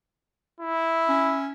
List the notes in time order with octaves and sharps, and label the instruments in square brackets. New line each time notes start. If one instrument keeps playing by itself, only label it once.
[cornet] E4
[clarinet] C#4